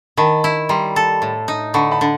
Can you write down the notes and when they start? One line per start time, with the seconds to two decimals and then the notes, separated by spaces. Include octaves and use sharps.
0.17 D#3 A5 B5
0.44 E4
0.69 G3 A#5 C6
0.96 A4
1.22 A2
1.48 D#4
1.74 D3 B5 C#6
1.91 A5 B5
2.01 D3